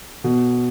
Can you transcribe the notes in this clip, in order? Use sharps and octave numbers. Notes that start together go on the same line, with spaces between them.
B2